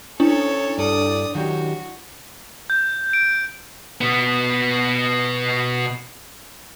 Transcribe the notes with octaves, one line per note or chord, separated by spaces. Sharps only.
C#4 D4 E4 A4 C#5
G2 A4 D5 D#6
D#3 F#3 F#4 G4
G6
D7
B2 B3